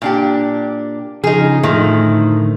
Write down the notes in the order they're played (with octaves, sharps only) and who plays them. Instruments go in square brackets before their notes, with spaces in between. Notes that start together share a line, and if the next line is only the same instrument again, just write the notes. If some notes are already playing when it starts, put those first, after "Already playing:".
[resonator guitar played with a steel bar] A#2 D4 G4
[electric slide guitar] C#3 F3 [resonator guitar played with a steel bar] D#4 G#4
[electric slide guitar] A2 D3 [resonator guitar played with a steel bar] D#3 F3 A3